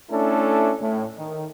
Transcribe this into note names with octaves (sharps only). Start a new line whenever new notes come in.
A3 C#4 D4 E4 A4
A2
D#3